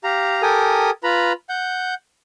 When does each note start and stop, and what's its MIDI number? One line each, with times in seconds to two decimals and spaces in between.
0.04 0.42 67
0.04 0.42 77
0.04 0.42 82
0.42 0.90 67
0.42 0.90 69
0.42 0.90 70
0.42 0.90 79
0.42 0.90 80
0.42 0.90 87
1.04 1.33 65
1.04 1.33 71
1.04 1.33 82
1.04 1.33 83
1.49 1.94 78
1.49 1.94 91